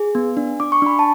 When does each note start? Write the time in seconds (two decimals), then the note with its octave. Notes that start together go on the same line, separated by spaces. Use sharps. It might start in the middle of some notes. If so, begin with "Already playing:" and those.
Already playing: G#4
0.15 B3
0.37 D4
0.60 D4 D6
0.72 C#6
0.82 D4 B5
0.99 A5